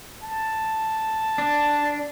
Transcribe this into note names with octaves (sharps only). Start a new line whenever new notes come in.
A5
D4